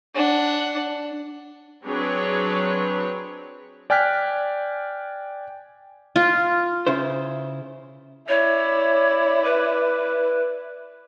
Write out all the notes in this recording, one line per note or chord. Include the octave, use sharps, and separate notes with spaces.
D4 F#5
F#3 C4 D4 G#4 B4 C#5
D5 G5 G#5 F6 F#6 B6
F4
C#3 E4 C5
E4 C#5 D5
B4